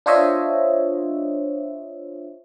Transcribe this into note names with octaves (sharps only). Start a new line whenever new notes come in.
D4 F4 C5 C#5 D#5 E5